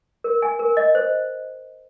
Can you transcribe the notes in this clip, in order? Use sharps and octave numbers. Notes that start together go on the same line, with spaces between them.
A#4
G#5
A#4
D#5
C5